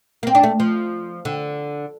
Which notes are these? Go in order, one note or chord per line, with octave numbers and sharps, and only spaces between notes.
A#3
C4
D4
A3
F3
D3